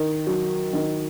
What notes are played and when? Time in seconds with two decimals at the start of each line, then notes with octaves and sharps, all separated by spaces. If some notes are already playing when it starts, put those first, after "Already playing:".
Already playing: D#3
0.27 F#3
0.73 D#3